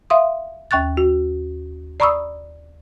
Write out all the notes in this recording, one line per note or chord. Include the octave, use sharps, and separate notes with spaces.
E5 F5 C6 D#6
D#2 G5 C#6 F#6 A6
F#4
D5 A#5 B5 C#6 D#6 E6